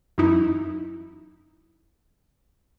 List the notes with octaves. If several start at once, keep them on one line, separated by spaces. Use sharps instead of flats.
F#2 E3 D#4 E4